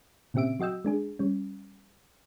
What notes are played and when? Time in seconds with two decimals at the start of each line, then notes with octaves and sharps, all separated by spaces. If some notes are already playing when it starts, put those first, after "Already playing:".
0.34 A#2 C#3 C4 G4 E5 D7
0.59 F#3 F#4 D#5 G5 E6
0.85 G#3 D4 G#4
1.19 G3 C#4